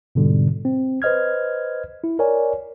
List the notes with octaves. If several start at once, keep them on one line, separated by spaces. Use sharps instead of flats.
G#2 B2 D3 G3
C4
B4 C5 D#5 F6 G#6
E4
A#4 C#5 D5 G#5